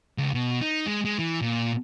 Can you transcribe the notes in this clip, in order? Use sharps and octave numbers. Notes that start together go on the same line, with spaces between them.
C#2
B2
D#4
G#3
G#3
E3
A#2